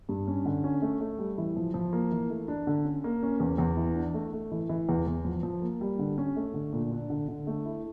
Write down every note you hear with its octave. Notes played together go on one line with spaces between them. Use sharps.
G2
C#4
D3
C#4
A3
A3
G3
E3
F3
F3
A#3
E3
A3
D4
D3
C#4
A#3
C#4
E2
E2
E3
D4
A3
A3
E3
E3
E2
E2
F3
F3
A#3
G3
D3
C#4
A3
D3
A#2
D4
D3
D3
A3
E4